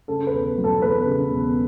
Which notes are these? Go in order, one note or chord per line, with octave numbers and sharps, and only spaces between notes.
C#3 A4
B4
E1
F#3
A4
E2 B4
C#3
E1